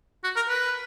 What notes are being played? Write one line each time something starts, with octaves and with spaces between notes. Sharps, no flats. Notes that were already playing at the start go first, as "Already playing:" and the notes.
F#4
A#4
B4